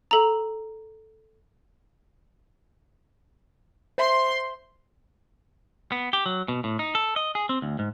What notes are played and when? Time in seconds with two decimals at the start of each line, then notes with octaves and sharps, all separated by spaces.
0.11 A4 A#5
3.98 C5 E5 C6
5.92 B3
6.13 G4
6.26 F#3
6.48 B2
6.64 A2
6.79 D#4
6.95 A4
7.16 D#5
7.35 G#4
7.49 C4
7.62 D2
7.79 G#2